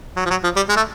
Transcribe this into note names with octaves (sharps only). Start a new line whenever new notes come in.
F#3
F3
F#3
F3
G3
G#3
A3